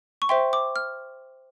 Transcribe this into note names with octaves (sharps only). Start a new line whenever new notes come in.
C#6
C5 E5 G5 C6
D6
F6